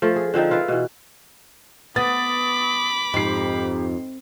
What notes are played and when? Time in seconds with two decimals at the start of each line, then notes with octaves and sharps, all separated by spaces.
0.02 F3 A3 F4
0.16 G#4
0.34 D3 F3 C4 D#4
0.50 E4 F4 B4 F5
0.68 B2 E3
1.96 B3 B5 D6 D#6 A6
3.14 F2 G#2 G4 C7